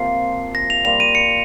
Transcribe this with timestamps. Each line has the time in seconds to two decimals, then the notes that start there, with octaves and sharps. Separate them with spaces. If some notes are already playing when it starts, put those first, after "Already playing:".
Already playing: C3 F3 A#3 F4 C7
0.55 A#6
0.70 F7
0.85 G3 A#3 F4 F7
1.00 D#7
1.15 C#7